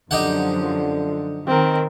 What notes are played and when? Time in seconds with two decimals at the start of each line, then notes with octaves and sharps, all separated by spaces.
0.11 F#2 D3 F3 D#4 G4 F#5
1.47 D#3 C4 A#4